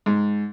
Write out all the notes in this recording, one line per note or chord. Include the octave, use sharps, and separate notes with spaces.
G#2